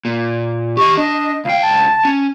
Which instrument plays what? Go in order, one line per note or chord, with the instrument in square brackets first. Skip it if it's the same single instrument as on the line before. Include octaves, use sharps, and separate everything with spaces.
[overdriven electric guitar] A#2
[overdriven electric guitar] G4 D#5 [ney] C#6
[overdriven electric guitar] D4 [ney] D#5
[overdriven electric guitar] C#2 G5 [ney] F5
[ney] A5
[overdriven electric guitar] C#4